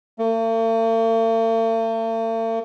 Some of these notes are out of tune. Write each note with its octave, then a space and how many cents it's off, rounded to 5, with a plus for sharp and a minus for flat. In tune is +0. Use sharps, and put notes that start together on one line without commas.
A3 +45